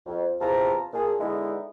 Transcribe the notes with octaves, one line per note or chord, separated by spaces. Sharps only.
F2
E2 C3 C4 F4 A5 A#5
A#2 G#4 A5
D3 G#3 B3 D#4 E4